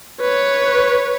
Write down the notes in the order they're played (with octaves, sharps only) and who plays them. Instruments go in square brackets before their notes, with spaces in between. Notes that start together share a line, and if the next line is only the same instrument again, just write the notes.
[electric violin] B4 C#5